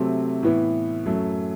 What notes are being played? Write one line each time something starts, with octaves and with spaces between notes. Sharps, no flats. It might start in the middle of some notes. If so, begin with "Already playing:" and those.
Already playing: C3 F#3 A3 C4
A2 E3 B3
F#2 F#3 A3